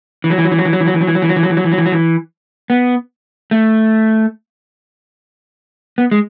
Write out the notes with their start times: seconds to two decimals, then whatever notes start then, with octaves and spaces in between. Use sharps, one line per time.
0.24 E3
0.30 F#3
0.38 E3
0.44 F#3
0.52 E3
0.58 F#3
0.65 E3
0.73 F#3
0.81 E3
0.87 F#3
0.94 E3
1.01 F#3
1.07 E3
1.15 F#3
1.22 E3
1.29 F#3
1.36 E3
1.43 F#3
1.50 E3
1.57 F#3
1.64 E3
1.72 F#3
1.78 E3
1.86 F#3
1.92 E3
2.70 B3
3.51 A3
5.98 B3
6.11 G#3